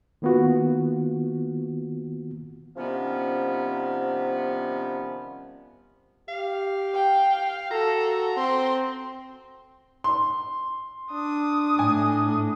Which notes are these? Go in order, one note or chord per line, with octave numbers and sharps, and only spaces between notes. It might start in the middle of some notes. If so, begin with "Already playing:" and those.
D#3 A#3 B3 F4 F#4
C3 D#3 F3 G3 B3 C#4
G4 F5
G5
F#4 A4 A#5
C4 C6
C6
D4 D#6
A2 G#5